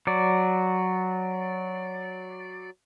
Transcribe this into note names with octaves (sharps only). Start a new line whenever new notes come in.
F#3 D5